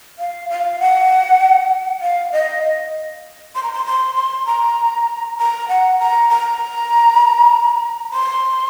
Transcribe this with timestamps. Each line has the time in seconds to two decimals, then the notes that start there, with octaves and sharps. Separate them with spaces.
0.19 F5
0.50 F5
0.79 F#5
2.02 F5
2.32 D#5
3.55 C6
3.63 A#5
3.72 C6
3.86 C6
4.15 C6
4.46 A#5
5.38 A#5
5.69 F#5
5.99 A#5
6.29 A#5
8.13 C6